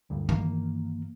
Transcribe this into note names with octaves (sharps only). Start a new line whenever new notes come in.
D2 G2 A#2
G2 D#3 E3 A#3